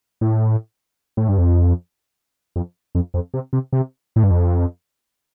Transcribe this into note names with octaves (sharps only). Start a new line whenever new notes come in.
A2
A2
G2
F2
F2
F2
F2
C3
C3
C3
A2
G2
F2